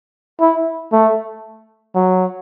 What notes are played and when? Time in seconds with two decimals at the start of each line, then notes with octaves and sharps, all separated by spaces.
0.41 E4
0.92 A3
1.95 F#3